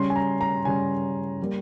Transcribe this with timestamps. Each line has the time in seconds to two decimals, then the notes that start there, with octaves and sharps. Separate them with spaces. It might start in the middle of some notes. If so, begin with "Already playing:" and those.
Already playing: C#3 G3 C#4 C6
0.10 G#5
0.16 A#5
0.41 A#5
0.64 C#3 G3 C#4 G#5
1.42 G3 A#3